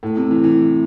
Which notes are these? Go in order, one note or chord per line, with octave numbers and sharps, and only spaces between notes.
A2
C3
E3
E3